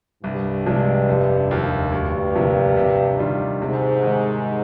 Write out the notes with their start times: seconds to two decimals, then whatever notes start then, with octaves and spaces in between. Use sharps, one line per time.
0.23 C2 G2
0.66 C3 F3 G#3 D4
1.08 F1
1.51 D#2 D3 F3 A#3
1.92 D2 G2
2.35 C3 F3 A#3
2.77 C3
3.18 D#3 G3 D4 F4
3.61 G#2 C3
4.03 D#3 G#3